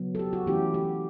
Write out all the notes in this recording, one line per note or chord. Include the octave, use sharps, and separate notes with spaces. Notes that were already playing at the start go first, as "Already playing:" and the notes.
Already playing: C#3 F#3 B3
A4
G4
F#4
E3 A3 C#4 E4 G4
G4